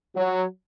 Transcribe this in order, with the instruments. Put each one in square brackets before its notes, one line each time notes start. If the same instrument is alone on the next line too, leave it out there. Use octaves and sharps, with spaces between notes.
[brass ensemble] F#3